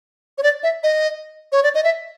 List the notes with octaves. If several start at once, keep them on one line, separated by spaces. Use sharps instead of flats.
C#5
D5
E5
D#5
C#5
D5
D#5
E5